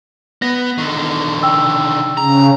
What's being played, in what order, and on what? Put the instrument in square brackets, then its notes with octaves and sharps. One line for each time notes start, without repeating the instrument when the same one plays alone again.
[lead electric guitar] B3 [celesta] A#6
[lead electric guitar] D3 D#3
[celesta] G5 E6
[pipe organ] C#3 [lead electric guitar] A#5